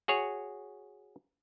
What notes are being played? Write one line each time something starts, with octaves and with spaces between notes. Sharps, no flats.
F#4 G#4 C#5